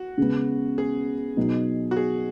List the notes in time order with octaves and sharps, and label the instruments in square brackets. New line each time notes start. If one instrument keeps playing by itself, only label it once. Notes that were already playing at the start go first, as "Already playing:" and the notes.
Already playing: [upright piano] F#4
[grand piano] C#3 G#3 B3
[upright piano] G#4
[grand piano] B2 F#3 D#4
[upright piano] F#4
G#4